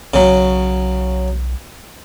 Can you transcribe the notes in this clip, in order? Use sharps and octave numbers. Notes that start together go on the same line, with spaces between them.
B1 C#3 F#3